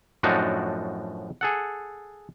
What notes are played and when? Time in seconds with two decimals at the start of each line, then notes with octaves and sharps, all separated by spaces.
0.23 F#2 A2 F3 D4 D#4 F#4
1.41 G#4 A4 F#5